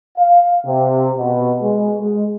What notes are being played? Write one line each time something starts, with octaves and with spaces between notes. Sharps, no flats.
F5
C3
B2
G#3
G#3